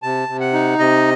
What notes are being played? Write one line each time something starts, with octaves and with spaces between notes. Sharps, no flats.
C3 A5
C3
F#5
D#4
C3 D#5